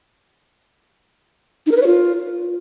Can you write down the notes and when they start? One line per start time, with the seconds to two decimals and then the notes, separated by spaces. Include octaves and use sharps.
1.66 D#4
1.72 A#4
1.77 B4
1.82 C#5
1.87 F4